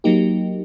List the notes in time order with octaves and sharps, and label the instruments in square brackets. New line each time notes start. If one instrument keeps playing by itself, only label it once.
[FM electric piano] F#3 A#3 D#4 G4